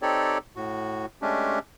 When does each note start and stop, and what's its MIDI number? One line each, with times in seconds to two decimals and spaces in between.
0.02 0.38 60
0.02 0.38 63
0.02 0.38 67
0.02 0.38 69
0.02 0.38 73
0.02 0.38 74
0.56 1.06 45
0.56 1.06 66
1.22 1.59 56
1.22 1.59 57
1.22 1.59 61
1.22 1.59 62
1.22 1.59 67